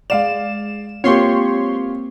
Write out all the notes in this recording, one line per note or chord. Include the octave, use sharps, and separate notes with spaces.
G#3 D5 F5 E7
A#3 C4 F4 G4 C#5 C6 C#6